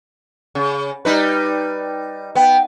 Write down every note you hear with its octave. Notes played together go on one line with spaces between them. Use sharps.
C#3
G3 D#4 B4
B3 G5